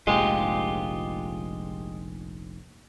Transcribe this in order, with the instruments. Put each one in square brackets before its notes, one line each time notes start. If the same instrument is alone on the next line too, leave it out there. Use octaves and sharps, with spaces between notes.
[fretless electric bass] F1 A#1 G#2 [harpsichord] G#3 [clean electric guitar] F4 G4